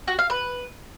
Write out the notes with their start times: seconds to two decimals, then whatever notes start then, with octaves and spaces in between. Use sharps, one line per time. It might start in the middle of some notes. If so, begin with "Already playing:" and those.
0.08 F#4
0.19 F5
0.30 B4